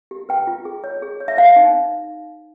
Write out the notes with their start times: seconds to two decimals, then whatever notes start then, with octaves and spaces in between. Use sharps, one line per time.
0.11 G4
0.29 B4 G5
0.47 F4
0.65 G#4
0.84 C#5
1.02 G#4
1.20 C#5
1.28 E5
1.37 C5 F5
1.56 D#4